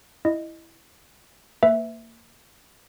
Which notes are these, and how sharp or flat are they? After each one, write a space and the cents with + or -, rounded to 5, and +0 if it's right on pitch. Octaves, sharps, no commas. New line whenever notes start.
E4 +0 D#5 -15
A#3 -25 B4 +20 E5 +0